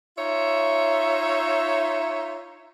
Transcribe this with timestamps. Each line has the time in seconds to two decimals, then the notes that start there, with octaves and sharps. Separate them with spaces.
0.17 D#4 F4 C#5 E5